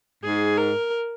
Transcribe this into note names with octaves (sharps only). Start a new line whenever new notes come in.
G#2 G#4
A#4